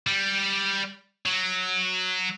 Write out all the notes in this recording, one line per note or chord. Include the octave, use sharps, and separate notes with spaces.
G3
F#3